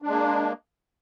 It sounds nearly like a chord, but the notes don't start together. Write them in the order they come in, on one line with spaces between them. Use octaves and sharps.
D4 G#3 A#3